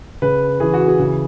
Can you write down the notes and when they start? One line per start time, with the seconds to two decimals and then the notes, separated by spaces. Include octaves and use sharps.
0.22 C#3 B4
0.60 E3 G#4
0.73 F#4
0.88 G#4
0.99 C#3